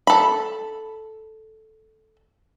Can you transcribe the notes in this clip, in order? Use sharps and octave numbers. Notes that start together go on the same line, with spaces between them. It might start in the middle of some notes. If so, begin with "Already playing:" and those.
A4 B5